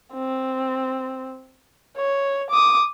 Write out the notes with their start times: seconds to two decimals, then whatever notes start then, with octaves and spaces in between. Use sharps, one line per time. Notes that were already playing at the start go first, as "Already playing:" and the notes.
0.13 C4
1.97 C#5
2.51 D6 D#6